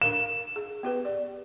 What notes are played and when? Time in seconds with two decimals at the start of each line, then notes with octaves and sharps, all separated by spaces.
0.02 D4 A#4 F5 E7
0.56 G#4
0.83 B3 G4 B4
1.05 D5